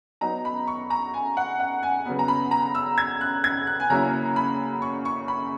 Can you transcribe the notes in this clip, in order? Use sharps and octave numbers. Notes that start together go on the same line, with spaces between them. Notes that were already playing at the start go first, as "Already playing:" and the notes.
F#3 B3 D#4 A#5
B5
C#6
A#5
G#5
F#5
F#5
G#5
C#3 F#3 B3
A#5
B5
A#5
E6
G#6
F#6
G#6
F#6
G#5
C#3 F#3 A#3 C#4 E4 A#5
B5
C#6
C#6
B5